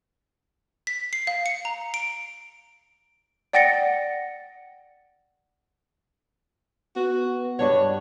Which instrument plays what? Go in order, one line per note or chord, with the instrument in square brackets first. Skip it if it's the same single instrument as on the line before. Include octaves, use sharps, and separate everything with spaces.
[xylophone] B6
C7
F5
C#7
A#5
D7
D5 F#5 G5 A6 A#6 C#7
[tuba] B3 [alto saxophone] F#4
[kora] G2 D4 F#5 [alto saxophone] C#5